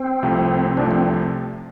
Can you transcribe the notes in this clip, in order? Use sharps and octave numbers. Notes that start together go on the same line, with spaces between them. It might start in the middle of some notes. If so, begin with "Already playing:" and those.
Already playing: C4
C2 C3 F3 A3
C2 C3 F3 A3 D4
C4